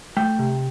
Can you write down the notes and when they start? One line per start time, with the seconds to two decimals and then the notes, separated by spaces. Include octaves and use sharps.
0.17 A3 G5
0.39 C3